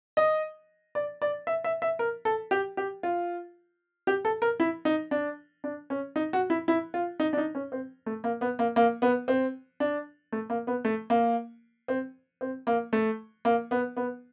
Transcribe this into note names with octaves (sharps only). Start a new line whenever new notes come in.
D#5
D5
D5
E5
E5
E5
A#4
A4
G4
G4
F4
G4
A4
A#4
E4
D#4
D4
D4
C#4
D#4
F#4
E4
E4
F4
D#4
D4
D#4
C#4
C4
A3
A#3
B3
A#3
A#3
B3
C4
D4
A3
A#3
B3
A3
A#3
C4
C4
A#3
A3
A#3
B3
B3